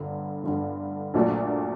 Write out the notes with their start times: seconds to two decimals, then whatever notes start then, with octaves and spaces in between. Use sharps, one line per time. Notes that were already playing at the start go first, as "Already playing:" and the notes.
Already playing: G1 G2 D3
0.44 G1 G2 D3
1.14 A#1 A#2 F#3 A3 D4